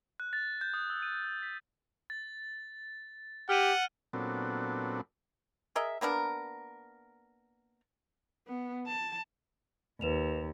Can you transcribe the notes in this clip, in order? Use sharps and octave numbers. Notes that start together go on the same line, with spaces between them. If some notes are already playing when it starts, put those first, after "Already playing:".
F#6
A6
G6
D#6
E6
D#7
F#6
B6
A6
G4 F#5 F6 D#7
A#2 F#3 B3 C4 D4 A4
G#4 A#4 D#5 E5
A#3 B3 D4 A#4
B3
A5
D#2 B4 E7 F7